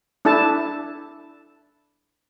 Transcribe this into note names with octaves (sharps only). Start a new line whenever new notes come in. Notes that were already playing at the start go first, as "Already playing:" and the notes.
D4 E4 A4 A5